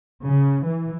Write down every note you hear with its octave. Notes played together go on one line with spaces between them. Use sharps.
C#3
E3